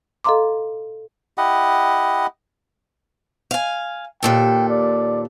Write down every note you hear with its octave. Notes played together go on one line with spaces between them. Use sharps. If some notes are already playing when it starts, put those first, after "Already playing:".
A4 D#5 F5 A#5 C6 D6
E4 G4 D#5 F#5
F5 G#5
D#2 A#2 A4 G5
D5